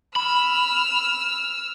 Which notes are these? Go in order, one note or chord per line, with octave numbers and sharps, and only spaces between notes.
B5 E6 F6